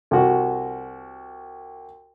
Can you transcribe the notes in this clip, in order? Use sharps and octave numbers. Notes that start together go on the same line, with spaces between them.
C2 F#4